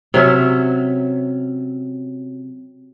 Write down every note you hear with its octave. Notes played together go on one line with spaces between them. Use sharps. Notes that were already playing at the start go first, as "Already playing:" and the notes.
C3 F#3 C#4 E5